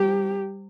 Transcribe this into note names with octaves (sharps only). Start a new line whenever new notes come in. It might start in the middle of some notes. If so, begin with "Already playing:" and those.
Already playing: G3 G4